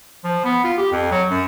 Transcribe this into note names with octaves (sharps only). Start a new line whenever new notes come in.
F3
B3
F4
G4
F2
F#3
F#2